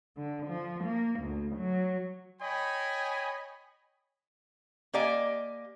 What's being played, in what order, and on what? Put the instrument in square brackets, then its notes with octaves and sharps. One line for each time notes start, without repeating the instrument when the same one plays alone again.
[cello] D3
F3
A#3
D2
F#3
[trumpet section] C#5 D#5 G5 G#5 B5
[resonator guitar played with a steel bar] A#3 G4 D5 D#5 G#5